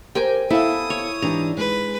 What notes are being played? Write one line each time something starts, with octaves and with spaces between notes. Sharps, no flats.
G4 A#4 C5 G5 G#5
B3 E4 A4 E5 F5 D#6
C#5
G#2 E3 D4 G4 A#5
G#3 B4